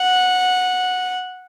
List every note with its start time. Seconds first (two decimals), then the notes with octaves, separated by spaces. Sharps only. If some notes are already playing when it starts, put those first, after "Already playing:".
Already playing: F#5